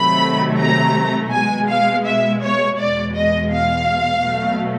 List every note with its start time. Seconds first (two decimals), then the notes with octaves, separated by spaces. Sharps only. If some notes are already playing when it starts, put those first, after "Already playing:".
Already playing: C3 D#3 F#3 A3 B5
0.60 A#5
1.32 B2 G#3 G#5
1.69 F5
2.05 E5
2.42 C#5
2.79 E2 B2 G#3 D5
3.15 D#5
3.52 F5
4.26 B2 F#3 A3